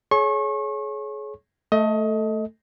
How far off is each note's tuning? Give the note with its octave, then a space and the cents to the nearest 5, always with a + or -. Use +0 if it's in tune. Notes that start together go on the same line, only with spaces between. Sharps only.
G#4 +35 C#5 +0 C#6 -35
A3 +0 A4 +5 D#5 +25